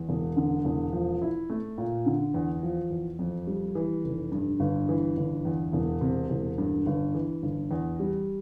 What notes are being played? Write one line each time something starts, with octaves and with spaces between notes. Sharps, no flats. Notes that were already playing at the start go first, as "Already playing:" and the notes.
Already playing: E2
E1
D3
E1
F3
E4
A3
A#2
D3
E2
F3
E2
F2
G3
E3
F1
G2
G1
E3
G1
E2
E1
C3
E1
G2
G1
E3
G1
E2
G3